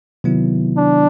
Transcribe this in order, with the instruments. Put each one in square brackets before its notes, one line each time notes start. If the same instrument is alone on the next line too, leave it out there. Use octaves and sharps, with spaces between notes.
[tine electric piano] C3 D#3 F#3 B3 E4
[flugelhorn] D4